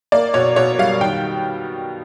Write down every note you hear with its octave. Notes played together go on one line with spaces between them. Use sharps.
A#3 D5
B2 C#5
B2 C#5
G3 F5
D#3 G5